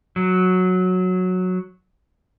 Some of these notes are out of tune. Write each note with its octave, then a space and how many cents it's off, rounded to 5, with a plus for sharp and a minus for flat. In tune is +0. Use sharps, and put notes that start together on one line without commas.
F#3 -10